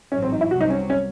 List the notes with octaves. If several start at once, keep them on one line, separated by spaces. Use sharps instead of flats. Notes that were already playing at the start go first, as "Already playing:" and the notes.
A1 G#2 F#3 C#4
C4
D#4
E4
C2 C3 F#3 F#4
D#4
C#4
C#4